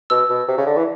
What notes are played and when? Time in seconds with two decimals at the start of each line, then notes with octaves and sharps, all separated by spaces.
0.10 B2 E6
0.29 B2
0.48 C3
0.58 C#3
0.66 D3
0.76 E3